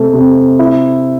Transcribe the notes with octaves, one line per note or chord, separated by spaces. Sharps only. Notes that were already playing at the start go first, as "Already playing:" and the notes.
Already playing: C3 A3
C3
E4